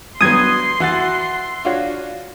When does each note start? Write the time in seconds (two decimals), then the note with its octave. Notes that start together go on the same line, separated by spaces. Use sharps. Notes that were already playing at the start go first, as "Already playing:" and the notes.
0.21 G2 F#3 B3 C6 D#6 G#6
0.80 E3 F#4 F#5 A6
1.65 D4 F4 F#4 C#5